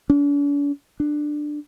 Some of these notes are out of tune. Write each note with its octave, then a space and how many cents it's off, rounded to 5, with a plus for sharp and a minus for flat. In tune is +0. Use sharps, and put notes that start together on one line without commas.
D4 -45
D4 +15